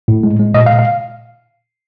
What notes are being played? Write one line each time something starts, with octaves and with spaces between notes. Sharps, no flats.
A2
G#3
G#3
A#2 D#5
F5
A#2
F5